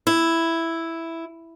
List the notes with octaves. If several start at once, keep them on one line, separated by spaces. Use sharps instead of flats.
E4